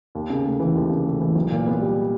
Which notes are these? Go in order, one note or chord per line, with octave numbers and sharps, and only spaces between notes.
D#2
C#3
A3
E3
D#2
C#3
A3
E3
B1
A#2
B3
G3